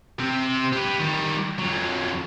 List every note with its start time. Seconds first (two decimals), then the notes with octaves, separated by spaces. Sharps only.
0.20 C3 C4
0.73 G4 B4
1.00 D#3 G3
1.59 F2 F#3